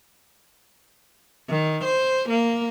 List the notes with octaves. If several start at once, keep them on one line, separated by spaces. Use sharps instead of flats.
D#3
C5
A#3